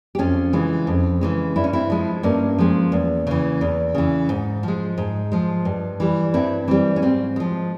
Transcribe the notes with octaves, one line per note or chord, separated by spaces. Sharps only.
G4
F2 C#4 F4
C#3 E3 G#3
F2
C#3 E3 G#3
G2 E4
C#4
C4 E4
F3 G#3
G2 A#3 C#4
F3 G#3
E2
C#3 E3
E2
C#3 E3
G#2
F3 G#3
G#2
F3 G#3
G2
E3 G3
G2 C4 E4
E3 G3 C4
C#4
G#2 C4
F3 G#3